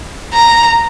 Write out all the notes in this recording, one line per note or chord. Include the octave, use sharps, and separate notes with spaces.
A#5